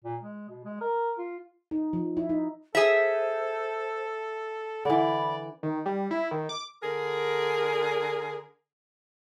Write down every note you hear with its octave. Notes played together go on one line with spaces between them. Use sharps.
A#2
G#3
B2
G#3
A#4
F4
D#4
F3
E4
D#4
G#4 A4 C5 E5
D3 E3 D5 B5
D#3
G3
E4
D#3
D6
D3 G#4 A#4